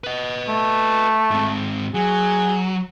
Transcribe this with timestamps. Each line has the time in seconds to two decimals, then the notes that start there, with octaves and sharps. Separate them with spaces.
0.04 B4 D#5
0.48 A3
1.31 G#2 C4
1.94 F#3 G#4